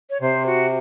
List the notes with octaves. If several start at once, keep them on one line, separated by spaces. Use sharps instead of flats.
C#5
C3 C5
F#4